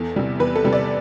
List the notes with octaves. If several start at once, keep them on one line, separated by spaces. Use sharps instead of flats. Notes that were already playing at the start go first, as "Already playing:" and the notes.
Already playing: E2 A4
C3 G3
E2 B4
A4
C3 G3
D5